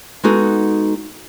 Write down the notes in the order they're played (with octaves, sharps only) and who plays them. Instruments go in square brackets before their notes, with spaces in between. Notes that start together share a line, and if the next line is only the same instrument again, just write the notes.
[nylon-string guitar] G#3 B3 D#4 F#4 A4